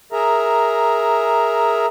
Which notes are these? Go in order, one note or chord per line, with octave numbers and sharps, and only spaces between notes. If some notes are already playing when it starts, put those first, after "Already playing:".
G#4 A#4 E5 A#5